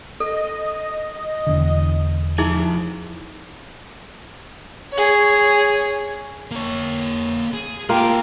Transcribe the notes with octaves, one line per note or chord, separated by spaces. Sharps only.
A4 D#5
E1 E2 D3
F3 D#4 E4 G#4 E5
G#4 C#5
A#3 C#5
G#4
A#3 F4 G4 G#4 A#4 G5